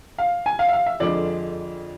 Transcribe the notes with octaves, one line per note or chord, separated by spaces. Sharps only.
F5
G#5
F5
E5
F5
E5
F2 D3 F3 G#3 D4 D5